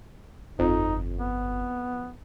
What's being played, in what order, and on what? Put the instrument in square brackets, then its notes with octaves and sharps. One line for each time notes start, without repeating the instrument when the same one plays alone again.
[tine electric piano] G1 [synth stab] F2 [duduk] D#4
[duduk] B3